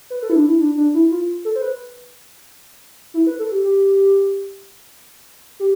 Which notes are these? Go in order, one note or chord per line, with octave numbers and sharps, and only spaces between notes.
B4
A4
E4
D4
E4
D4
D4
E4
F4
A4
C5
B4
E4
B4
A4
G4
G4
G4